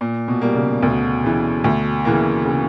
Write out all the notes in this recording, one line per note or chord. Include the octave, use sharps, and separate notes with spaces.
A#2
B2
G3 A#3
C#3
D2 B2
C#3 E3
D2
C#3 E3 A#3
C#3